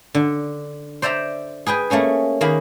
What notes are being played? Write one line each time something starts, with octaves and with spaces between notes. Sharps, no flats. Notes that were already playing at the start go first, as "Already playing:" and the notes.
D3
C5 D5 E5 G5 A#5
G#4 B4 G5 G#5
A3 A#3 C#4 G#4
D#3 A#3 G#4 B5